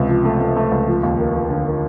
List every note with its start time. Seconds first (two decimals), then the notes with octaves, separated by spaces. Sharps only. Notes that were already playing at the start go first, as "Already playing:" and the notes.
Already playing: C#2 C3
0.09 F3
0.25 A3
0.41 A3
0.57 A3
0.72 C#2
0.88 F3
1.03 D#2
1.19 A#3
1.34 F3
1.50 D3
1.67 A#3